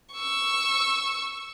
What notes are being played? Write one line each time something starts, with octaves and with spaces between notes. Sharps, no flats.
C#6 E6